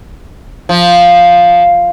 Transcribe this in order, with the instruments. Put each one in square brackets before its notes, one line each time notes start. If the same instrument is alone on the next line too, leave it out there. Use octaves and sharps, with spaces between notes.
[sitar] F3